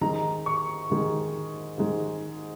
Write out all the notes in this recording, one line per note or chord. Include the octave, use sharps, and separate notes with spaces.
G#2 D#3 G#3 D#4 A#5
C#6
G#2 D#3 G#3 D#4
G#2 D#3 G#3 D#4